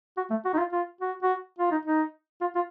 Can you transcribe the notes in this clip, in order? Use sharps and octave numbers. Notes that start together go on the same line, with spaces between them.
F#4
A3
F#4
D#4
F4
F4
F#4
F#4
F4
D#4
D#4
F4
F4